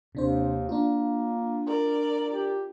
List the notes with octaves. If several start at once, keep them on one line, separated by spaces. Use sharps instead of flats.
D#2 C3 D4 C5
A#3 D4 F4
A#4 D5
G4